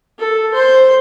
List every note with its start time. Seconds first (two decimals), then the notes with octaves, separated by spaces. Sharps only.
0.19 A4
0.54 C5